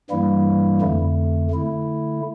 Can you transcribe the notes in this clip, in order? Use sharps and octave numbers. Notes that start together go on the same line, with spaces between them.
G2 E3 G3 A#3 E4
F2 D3 A3
D3 A3 E4